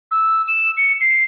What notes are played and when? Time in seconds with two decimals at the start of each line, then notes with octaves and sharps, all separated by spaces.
0.11 E6
0.48 E7
0.77 C#7
1.01 C7